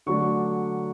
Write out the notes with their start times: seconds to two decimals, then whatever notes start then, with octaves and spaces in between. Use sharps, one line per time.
0.06 D3 F#3 A3 D4 C#6